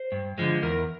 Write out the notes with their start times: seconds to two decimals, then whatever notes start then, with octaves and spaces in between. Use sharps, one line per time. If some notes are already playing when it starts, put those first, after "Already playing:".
Already playing: C5
0.12 G2
0.38 D3 F3 G#3
0.62 E2 A#4